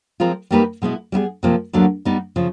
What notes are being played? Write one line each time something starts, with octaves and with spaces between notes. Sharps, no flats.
F3 G#3 C4 F4 A#4
G3 A#3 D#4 G4 B4
B2 G#3 B3 E4
G3 B3 E4 G#4
C3 F3 A#3
D2 D3 F#3 A#3
G3 B3 D#4
C#3 F3